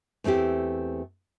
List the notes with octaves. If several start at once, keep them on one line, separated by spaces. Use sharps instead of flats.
E2 A3 C4 E4 G4